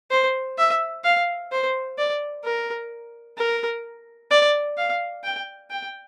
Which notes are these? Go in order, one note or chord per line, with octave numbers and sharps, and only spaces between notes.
C5
E5
F5
C5
D5
A#4
A#4
D5
F5
G5
G5